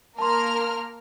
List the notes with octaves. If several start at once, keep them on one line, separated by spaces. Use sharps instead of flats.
A#3 A#4 A5 C6 F6